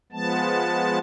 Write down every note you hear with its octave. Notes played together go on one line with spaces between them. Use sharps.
F3 G#3 B3 A5